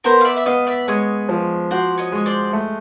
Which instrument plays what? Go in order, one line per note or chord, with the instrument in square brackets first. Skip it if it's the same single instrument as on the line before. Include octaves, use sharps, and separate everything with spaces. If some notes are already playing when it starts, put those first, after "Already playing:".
[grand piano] B3 [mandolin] A#4 C5
[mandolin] F5
D5 E5
E5
[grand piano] B3 [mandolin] D#5 F5
[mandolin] D5 E5
[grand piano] G#3 [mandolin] C#5 D#5
[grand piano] F3
[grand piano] F#4 [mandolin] C5 D5
[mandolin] C#5 D#5
[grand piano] G#3 [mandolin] C#5
[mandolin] C5 D5
[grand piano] A3